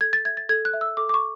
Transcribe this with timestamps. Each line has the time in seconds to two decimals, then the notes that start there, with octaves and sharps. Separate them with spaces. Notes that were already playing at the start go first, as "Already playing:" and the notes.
0.01 A4 G#6
0.13 A6
0.25 E5 G#6
0.37 A6
0.49 A4 G#6
0.65 F#6
0.73 E5
0.81 E6
0.97 A4 D6
1.09 D6
1.14 C#6